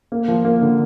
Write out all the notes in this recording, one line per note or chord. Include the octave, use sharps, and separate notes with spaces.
A#3
F3
A#3
D3